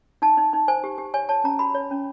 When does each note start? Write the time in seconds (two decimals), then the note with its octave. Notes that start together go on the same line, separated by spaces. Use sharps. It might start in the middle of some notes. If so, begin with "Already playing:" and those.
0.22 D#4 A5
0.37 D#4
0.53 D#4
0.68 C5 G#5
0.84 G4
0.98 G4
1.14 C#5 G#5
1.29 C#5 A5
1.44 C#4 A#5
1.59 F#4 B5
1.74 C#5
1.91 C#4